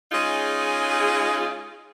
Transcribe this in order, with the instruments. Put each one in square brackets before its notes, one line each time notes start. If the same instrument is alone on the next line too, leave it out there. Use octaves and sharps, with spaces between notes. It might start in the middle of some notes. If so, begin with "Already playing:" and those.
[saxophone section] G#3 C#4 D#4 F4 G#4